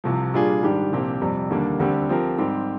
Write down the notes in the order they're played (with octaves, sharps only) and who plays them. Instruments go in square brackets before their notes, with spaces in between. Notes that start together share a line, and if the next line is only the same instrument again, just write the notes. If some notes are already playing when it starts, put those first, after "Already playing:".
[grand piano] C2 C3 F3
A#2 G3 D4 F4 G#4
G#2 D#3 G3 D4 G4
C2 A#2 F3 C4 G4
F2 C3 G3
D#2 D3 G3 A#3 D4
D2 D3 G3 C4 G4
F3 C4 G4 A#4
G#2 G3 C4 G4